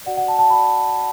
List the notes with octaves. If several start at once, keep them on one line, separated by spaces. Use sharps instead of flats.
F#4 D5 F#5
F#5
A5
A5
F#4 D5 B5